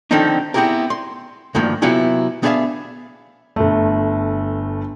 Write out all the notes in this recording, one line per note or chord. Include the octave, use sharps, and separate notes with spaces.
D3 D#3 F3 C4 D4 D#4
B3 C4 E4 G4 G#4 A#4
C6
D2 G2 D#3 F3 A#3
C3 F#3 B3 E4 F4 G#4
B3 D4 G#4 A#4 E5 F5
G1 A3